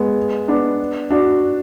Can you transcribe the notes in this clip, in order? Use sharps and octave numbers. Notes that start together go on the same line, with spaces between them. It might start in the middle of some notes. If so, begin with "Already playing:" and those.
Already playing: G#3 B3
B3 D4
D4 F#4